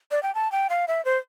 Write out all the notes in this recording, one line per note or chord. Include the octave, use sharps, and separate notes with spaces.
D5
G5
A5
G5
F5
E5
C5